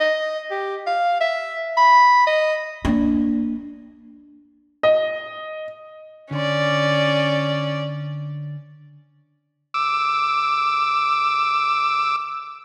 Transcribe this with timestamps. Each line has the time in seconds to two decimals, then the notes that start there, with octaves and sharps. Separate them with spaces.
0.01 D#5
0.51 G4
0.87 F5
1.21 E5
1.78 B5
2.27 D#5
2.85 A#3 D4
4.83 D#5
6.31 D3 C#4 D5 C6
9.74 D6 E6